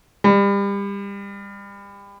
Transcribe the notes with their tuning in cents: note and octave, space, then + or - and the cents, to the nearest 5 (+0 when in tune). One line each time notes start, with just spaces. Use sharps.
G3 +30